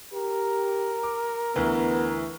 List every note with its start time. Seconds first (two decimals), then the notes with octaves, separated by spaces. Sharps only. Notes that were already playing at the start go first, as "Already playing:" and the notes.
0.14 G4 A#4
1.03 D6
1.56 D2 E3 B3